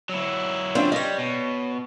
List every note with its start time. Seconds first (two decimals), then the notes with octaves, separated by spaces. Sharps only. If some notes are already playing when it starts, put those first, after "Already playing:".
0.09 F#3 E4
0.75 C4 D4 F4
0.92 G3 C#5 D#5
1.18 B2